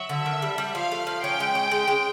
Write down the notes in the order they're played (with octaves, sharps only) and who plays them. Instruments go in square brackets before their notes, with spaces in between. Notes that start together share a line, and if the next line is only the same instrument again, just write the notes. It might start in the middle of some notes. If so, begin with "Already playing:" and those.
Already playing: [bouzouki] F#3 [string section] E5
[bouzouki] D3
D#3
G3
G3
[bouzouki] F3 [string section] F5
[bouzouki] A3
F3
[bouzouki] C#4 [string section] G5
[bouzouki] G#3
C#4
G#3
G#3